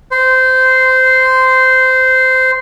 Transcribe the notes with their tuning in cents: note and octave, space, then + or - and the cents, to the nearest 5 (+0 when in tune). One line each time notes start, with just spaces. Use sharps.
C5 -15